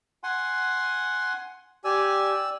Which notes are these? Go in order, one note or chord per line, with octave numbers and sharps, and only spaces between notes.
F#5 G#5 C6
G4 D5 G#5 E6